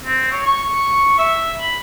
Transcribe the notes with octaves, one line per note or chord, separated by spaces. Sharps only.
C4
C#5
C#6
E5
B5